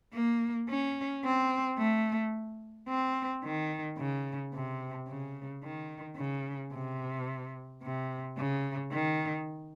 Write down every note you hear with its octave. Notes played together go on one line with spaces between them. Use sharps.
A#3
C#4
C4
A3
C4
D#3
C#3
C3
C#3
D#3
C#3
C3
C3
C#3
D#3